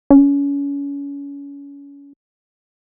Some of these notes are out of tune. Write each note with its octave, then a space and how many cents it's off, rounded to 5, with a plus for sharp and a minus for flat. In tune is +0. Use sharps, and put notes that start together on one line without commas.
C#4 +30